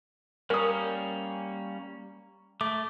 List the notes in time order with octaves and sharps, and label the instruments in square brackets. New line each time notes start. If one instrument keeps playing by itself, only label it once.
[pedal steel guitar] G3 A#3 C#4 [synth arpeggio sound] A#4 D#6
[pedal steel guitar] A3 [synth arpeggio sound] D6